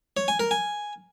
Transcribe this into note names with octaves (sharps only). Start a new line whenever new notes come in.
C#5
G#5
A#4
G#5